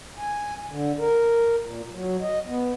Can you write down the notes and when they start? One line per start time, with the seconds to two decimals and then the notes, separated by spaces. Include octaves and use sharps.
0.18 G#5
0.68 D3
0.99 A#4
1.63 A#2
1.92 F#3
2.22 D#5
2.47 B3